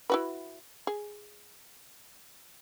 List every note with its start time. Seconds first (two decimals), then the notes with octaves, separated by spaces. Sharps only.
0.10 E4 F#4 B4
0.87 G#4